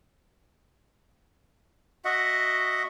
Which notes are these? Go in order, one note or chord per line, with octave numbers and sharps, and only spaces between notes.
F#4 D#5 E5 F#5